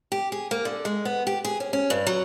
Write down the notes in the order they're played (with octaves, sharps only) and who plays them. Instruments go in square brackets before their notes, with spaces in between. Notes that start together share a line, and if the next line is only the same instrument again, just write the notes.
[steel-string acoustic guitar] G4
G#4
A#3
D3
G#3
B3
G4
G#4
C#4
C#4
G2
F#3